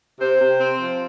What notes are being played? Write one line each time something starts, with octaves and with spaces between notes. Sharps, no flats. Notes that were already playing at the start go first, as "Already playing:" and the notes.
C3 C5
C3
C4
F3